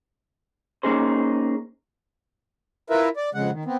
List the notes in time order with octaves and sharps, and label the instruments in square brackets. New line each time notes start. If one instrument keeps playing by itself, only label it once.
[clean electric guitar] A#3 C#4 D#4 G#4 C5
[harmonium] E4 F4 A#4 B4 E5
D5
F2 C#3 G#3 F#5
D#3
B3 C4